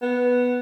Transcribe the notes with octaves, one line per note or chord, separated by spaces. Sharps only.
B3